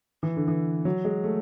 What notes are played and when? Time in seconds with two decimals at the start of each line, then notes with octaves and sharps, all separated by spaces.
0.23 E3
0.36 D3
0.48 E3
0.85 F#3
1.05 G#3
1.24 A3